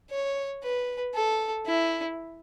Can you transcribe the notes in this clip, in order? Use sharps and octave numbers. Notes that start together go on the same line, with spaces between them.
C#5
B4
A4
E4